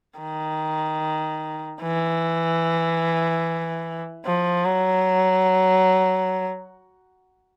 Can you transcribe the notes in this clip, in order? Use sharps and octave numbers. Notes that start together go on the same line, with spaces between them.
D#3
E3
F3
F#3